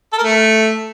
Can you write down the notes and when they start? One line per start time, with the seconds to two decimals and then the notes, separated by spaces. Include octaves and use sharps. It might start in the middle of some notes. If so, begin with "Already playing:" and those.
0.13 A4
0.18 A#4
0.23 A3